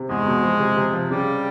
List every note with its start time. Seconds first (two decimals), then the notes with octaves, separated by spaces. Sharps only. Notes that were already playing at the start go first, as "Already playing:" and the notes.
Already playing: C3
0.09 E2 G#3
0.26 B2
0.43 F3
0.60 C3
0.77 C3
0.93 F3
1.10 C#3 G3